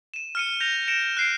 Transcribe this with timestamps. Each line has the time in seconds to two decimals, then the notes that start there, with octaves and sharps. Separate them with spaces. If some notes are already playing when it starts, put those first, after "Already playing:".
0.14 D#7 E7
0.35 F6 C#7 D#7
0.60 G6 A#6 F7
0.88 A#6 C#7 D7 E7
1.17 F#6 C7 D7